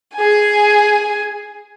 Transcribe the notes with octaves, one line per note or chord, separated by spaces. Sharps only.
G#4 G#5